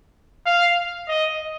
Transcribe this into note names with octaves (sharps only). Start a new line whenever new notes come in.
F5
D#5